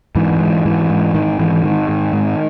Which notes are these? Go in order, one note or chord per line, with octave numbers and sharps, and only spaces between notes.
G#2 E3
G#2
G#2 E3
G#2
G#2 D#3
G#2 E3
G#2 D#3
G#2
G#2